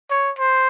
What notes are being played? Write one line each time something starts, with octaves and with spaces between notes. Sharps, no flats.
C#5
C5